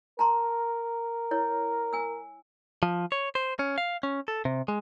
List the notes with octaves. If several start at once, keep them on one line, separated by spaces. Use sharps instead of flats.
A#4 A5 A#5 C6
E4 C#5
G#5 E6
F3
C#5
C5
C#4
F5
C#4
A4
C3
G#3